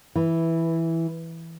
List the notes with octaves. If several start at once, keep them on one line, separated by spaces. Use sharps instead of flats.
E3